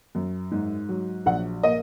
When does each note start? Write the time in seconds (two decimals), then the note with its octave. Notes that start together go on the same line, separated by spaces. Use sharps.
0.15 F#2
0.51 G#2
0.89 F#3
1.26 A#1 F#5
1.63 A#3 D#5